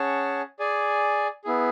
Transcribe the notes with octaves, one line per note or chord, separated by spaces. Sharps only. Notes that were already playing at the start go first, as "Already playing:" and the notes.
Already playing: C#4 G#4 C#5 F#5 A5
G#4 D5 G#5
B3 E4 G#4